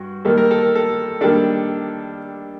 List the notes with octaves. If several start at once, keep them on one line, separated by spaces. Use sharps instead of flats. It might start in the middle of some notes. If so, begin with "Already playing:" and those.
Already playing: G2 F#4
D#3 G3 A#3 A4
A#4
A4
A#4
A4
D#3 G3 A#3 D4 A4